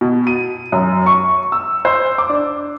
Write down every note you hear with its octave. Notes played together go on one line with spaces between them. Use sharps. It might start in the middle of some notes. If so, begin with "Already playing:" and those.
B2
D#7
F#2
C#6
E6
C5
D6
D4